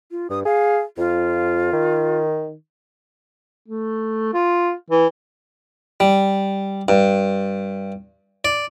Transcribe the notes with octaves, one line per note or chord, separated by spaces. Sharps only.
F4
G2 D#6
G#4 F5
F2 F4
D#3
A3
F4
E3
G3
G2
D5